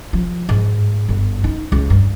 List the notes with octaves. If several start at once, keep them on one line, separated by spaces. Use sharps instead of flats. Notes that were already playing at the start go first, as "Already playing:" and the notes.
F3
G#2
G1
D#4
C#2
G2